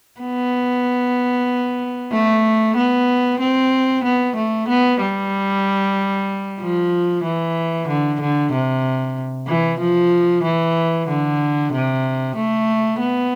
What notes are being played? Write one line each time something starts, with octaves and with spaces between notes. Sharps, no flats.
B3
A3
B3
C4
B3
A3
B3
G3
F3
E3
D3
D3
C3
E3
F3
E3
D3
C3
A3
B3